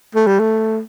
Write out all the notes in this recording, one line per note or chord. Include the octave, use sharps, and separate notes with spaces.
A3
G3
A3